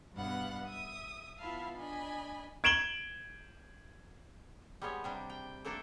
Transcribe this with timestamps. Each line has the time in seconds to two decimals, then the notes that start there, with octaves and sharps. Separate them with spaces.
0.14 G2 B2 B3 F5 F#5 F#6
0.66 E5 D#6
1.39 B3 E4 F4 E5 F5 A5
1.78 D4 D#5 G#5 B5
2.64 G#6 D7 E7 F#7 G7
4.82 G3 G#3 B3 C#5
5.04 C3 G3 D4
5.30 G5
5.65 A3 A#3 D4 A4 A#4